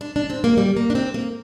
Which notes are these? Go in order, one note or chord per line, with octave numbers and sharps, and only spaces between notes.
D4
D4
C4
A#3
G3
A#3
D4
C4
A#3